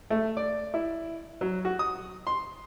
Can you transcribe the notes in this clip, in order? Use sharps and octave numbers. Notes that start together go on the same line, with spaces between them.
A3
D5
E4
F#3
F#4
D#6
C6